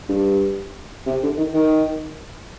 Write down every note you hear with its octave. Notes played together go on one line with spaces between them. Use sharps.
G2
C3
D3
D#3
D#3